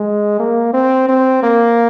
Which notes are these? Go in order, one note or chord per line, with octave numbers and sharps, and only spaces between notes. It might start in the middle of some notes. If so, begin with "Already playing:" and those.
Already playing: G#3
A#3
C4
C4
A#3